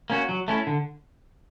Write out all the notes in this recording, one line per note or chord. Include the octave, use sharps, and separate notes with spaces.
A#3 C#4 F#4
F#3
A3 C#4 E4
D3